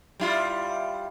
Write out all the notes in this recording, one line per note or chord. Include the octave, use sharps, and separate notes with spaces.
G3 E4 F4